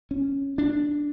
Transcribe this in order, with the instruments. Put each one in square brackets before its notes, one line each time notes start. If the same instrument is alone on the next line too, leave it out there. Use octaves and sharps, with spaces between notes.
[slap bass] C#4
D4